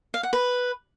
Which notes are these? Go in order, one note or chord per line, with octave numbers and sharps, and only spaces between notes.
F5
F#5
B4